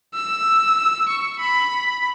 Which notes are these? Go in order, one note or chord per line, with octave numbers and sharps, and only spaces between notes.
E6
C#6
B5